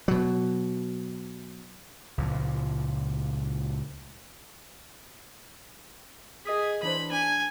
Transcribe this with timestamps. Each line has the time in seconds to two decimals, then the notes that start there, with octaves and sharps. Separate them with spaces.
0.08 B2 F#3
2.18 C#2 A#2 F3
6.45 G#4 D#5 D#6 B6
6.83 E3 D4 C5 B5
7.12 D4 G#5